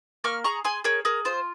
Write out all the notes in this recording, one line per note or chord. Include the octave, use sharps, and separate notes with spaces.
A#3 C#6 F6
G#4 A#5 C#6
G#4 G#5 C6
G#4 A#4 C#5
G#4 A#4
F4 C5